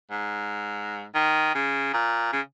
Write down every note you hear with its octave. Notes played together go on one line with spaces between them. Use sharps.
G#2
D#3
C#3
A#2
C#3